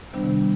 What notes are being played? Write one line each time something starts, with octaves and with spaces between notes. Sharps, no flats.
C3 D#3 G3 B3 D4